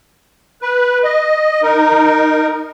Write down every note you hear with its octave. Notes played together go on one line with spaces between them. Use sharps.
B4
D#5
D#4 A#4